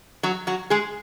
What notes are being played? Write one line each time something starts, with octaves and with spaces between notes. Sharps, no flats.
F#3 F#4
F#3 F#4
G#3 G#4